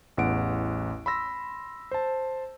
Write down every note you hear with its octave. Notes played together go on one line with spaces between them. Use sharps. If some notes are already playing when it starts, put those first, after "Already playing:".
A1 E2 F#5 D7
B5 C6 E6 A#6
C5 A5